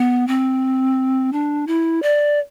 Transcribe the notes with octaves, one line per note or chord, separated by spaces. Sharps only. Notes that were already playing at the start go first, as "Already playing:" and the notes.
Already playing: B3
C4
D4
E4
D5